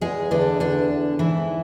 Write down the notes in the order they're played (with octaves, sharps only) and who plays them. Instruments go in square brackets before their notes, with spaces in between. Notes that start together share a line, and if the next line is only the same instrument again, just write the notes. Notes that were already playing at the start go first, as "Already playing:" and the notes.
[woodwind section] E2 [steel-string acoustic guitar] G#3 G#4
[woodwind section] E2 [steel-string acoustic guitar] D3 D4
[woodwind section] E2 [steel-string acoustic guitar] D3 D4
[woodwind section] E2
[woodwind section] G#2 [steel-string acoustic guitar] E3 E4